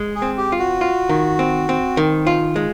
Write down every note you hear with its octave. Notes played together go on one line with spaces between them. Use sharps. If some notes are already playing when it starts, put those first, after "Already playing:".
Already playing: G#3
G#4
C4
G4
F4
F#4
F4
D#3
C4
C4
D#3
F4
G#3